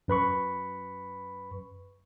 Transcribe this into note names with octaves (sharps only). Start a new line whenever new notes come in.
F#2 B4 B5 C#6